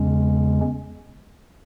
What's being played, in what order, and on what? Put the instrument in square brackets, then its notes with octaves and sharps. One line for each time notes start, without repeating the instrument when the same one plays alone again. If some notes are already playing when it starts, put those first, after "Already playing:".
Already playing: [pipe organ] E2 C#3 G#3 C#4